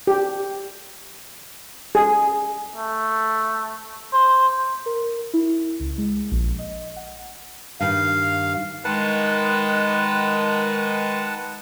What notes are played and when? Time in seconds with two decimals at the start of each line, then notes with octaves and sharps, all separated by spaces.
0.07 G4
1.95 G#4
2.76 A3
4.13 C5
4.86 A#4
5.34 E4
5.80 C#2
5.98 G#3
6.31 A#1
6.59 D#5
6.96 F#5
7.80 G2 D#3 F5
8.85 D#3 G#3 B4 F#5 A5